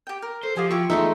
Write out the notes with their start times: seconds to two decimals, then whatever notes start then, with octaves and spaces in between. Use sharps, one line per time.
0.07 G4 G5
0.22 A#4
0.43 A4 C5
0.57 F3 F4 G4 D#5 G#5
0.71 E4 F4 G4 E5 C#6
0.90 E2 G#3 A3 D#4 E5